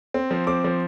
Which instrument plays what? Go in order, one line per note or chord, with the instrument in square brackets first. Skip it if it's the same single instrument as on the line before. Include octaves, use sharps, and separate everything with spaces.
[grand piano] C4
F3
C4 D6
F3